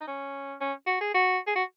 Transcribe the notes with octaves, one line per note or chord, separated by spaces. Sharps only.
D#4
C#4
C#4
F#4
G#4
F#4
G#4
F#4